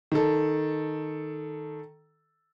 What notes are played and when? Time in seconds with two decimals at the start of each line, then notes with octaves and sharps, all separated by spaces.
0.12 D#3 A4